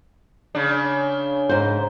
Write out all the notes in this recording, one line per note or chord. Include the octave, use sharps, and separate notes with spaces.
C#3 D4
G#2 C5